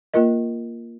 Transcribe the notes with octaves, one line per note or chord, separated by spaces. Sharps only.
A#3 F4 A#4 D#5